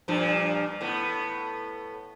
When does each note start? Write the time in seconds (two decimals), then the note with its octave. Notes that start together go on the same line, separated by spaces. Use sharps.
0.08 G2 A#2 F3
0.81 A2 B3